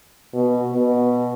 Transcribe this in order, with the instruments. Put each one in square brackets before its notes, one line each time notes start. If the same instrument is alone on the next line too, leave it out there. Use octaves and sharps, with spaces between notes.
[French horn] B2
B2